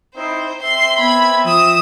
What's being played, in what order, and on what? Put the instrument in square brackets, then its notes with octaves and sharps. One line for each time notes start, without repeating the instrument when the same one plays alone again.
[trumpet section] C4 D#4 E4 [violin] C5
[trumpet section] C4 E5 [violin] C6
[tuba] B3 [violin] B5 G#6
[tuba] F3 [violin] D#6 E7